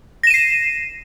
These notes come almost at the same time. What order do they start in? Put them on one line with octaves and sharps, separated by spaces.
A#6 E7 D#7 C7